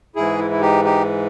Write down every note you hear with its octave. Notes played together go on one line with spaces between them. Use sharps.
G#2 E3 E4 G#4
E4
E4
D#4 G4
D#4 G4